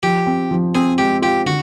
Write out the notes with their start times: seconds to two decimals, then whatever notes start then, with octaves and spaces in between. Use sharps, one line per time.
0.03 F3 G4
0.27 C4
0.51 F3
0.75 C4 G#4
0.98 G#3 G4
1.22 F4 G4
1.46 D3 F#4